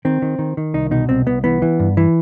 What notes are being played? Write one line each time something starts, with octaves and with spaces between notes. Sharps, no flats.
D#3 C4
D#3
D#3
D#3
C2 D#4
B2 D#4
C2 C4
C2 B3
E3 B3
E3
G2
E3